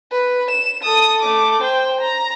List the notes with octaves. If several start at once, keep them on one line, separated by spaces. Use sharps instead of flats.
B4
E7
A4 D#6
A3 D6
C5 G5
A#5